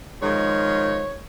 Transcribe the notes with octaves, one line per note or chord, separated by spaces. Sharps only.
D#3 F3 G#3 C#5